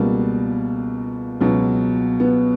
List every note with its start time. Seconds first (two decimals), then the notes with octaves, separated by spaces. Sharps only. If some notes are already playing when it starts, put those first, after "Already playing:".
Already playing: C#2 B2 G3 A#3
1.40 C#2 B2 F#3
2.20 B3